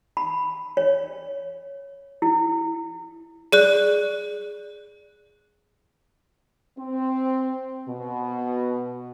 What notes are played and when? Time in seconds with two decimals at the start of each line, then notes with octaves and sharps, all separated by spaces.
0.17 B5
0.77 C#5
2.22 E4
3.52 G#4 D5 F#6
6.78 C4
7.89 B2